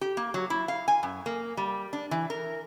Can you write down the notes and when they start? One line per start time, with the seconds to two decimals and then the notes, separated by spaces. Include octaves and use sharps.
0.01 G4
0.17 A#3
0.34 F#3
0.50 E4
0.68 F5
0.88 G#5
1.03 F#2
1.26 A#3
1.57 G3
1.93 D4
2.11 E3
2.30 A#4